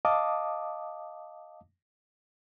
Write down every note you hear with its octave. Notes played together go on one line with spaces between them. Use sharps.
D#5 F5 A5 D6 D#6